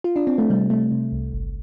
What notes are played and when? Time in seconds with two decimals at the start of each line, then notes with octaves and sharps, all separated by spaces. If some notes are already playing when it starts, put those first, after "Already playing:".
0.04 F4
0.16 D4
0.27 C4
0.38 A3
0.50 C3 G3
0.70 C3 A3
0.91 C3
1.12 C2
1.32 G1